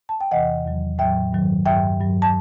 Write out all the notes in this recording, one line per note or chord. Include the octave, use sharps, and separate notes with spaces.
A5
G5
E2 C3 E3 D#5 F#5
E2 D#3 F#3
A2 F#3 E5 G5
G2 D#3 F#3
G2 F#3 E5 G5
G2 F#3
A5